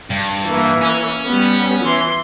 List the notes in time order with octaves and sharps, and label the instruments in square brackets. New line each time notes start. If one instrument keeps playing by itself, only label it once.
[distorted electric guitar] G2
[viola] E3 A#3
[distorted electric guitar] C#4
[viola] G3 B3
E3 C6